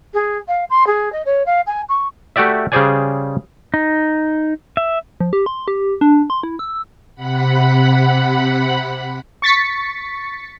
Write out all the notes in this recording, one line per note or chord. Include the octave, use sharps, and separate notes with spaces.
G#4
F5
C6
G#4
D#5
C#5
F5
G#5
C#6
A3 F#4 G4 D5 E5
C#3 G3 G#4 C5 D5 G#5
D#4
E5
F3
G4
C6
G4
D4
C6
E4
E6
C3 F#5 B5
C#6 A6 B6 C#7